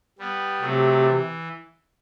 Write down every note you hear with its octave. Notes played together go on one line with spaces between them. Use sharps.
G3 B3
C3 F#3 A3
E3